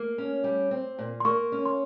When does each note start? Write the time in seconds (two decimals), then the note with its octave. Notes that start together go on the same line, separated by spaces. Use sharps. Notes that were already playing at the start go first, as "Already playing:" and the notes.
Already playing: A#3
0.18 C#4
0.44 G3
0.71 C4
0.99 A#2
1.20 C6
1.25 A#3 C#6
1.52 C#4
1.66 C6